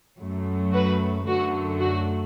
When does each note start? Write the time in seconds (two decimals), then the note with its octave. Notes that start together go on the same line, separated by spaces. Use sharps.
0.18 F#2 F#3 A3
0.72 F#4 B4
1.26 F#2 D3 F#3 A3 F#4
1.80 F#4